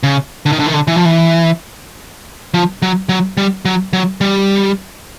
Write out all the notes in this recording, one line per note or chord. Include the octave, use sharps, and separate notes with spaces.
C#3
D3
D#3
D3
D#3
D3
E3
F3
E3
F3
F#3
F#3
G3
F#3
F#3
G3